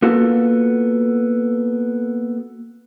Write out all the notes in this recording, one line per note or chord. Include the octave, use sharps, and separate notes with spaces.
A#3 B3 F4 F#4 A4